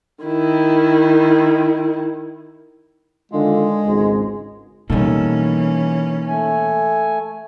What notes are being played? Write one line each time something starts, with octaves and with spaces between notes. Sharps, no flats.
D#3 E4
D3 D#3 G#3 F4
G#1 C#2 G#2
B2 E3 G3 A#3 C#4 D#4 A4
A3 G#5